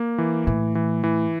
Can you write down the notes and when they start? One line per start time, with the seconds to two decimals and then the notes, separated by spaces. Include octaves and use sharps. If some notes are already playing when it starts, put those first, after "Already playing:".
Already playing: A#3
0.18 E3
0.47 A2 E3
0.75 E3
1.04 E3